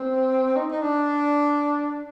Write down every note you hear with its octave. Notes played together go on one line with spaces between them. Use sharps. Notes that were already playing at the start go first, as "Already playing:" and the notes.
Already playing: C4
D#4
D#4
D4